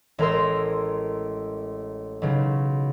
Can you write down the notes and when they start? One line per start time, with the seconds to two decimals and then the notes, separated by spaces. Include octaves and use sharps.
0.18 A1 G#3 A#4 A#5 C6 E6
2.22 B1 C#3